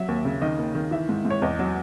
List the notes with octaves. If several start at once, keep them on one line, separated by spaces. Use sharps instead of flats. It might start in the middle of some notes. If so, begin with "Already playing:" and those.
Already playing: F#3 E5
D#2
C#3
D#3 D#5
D#2
D#3
E3 E5
G#2
G#2
C#5
E2 D#5
F#3